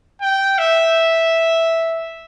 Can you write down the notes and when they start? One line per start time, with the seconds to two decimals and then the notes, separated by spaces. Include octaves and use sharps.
0.22 G5
0.58 E5